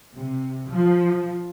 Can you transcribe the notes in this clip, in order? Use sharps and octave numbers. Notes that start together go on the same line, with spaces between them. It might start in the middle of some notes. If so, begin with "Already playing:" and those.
C3
F3